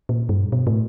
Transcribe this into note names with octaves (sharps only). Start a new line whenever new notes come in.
A#2
G2
B2
A2